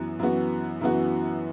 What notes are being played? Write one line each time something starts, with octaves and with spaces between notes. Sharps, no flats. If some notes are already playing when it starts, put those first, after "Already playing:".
Already playing: F#2 E3 B3 F#4
F#2 E3 B3 F#4
F#2 E3 B3 F#4